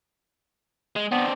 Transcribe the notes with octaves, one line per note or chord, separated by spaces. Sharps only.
G#3
B3 C4 D4